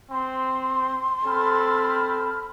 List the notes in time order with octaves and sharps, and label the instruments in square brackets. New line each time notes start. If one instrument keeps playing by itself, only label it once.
[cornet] C4 [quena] C6
[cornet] C4 [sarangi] A4 [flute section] B5 F6